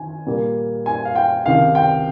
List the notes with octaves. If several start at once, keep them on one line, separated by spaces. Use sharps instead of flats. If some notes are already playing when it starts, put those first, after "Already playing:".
Already playing: D#3 G#5
A#2 G3 A#3
G#5
F5
G5
C#2 C3 D#3 F5
G5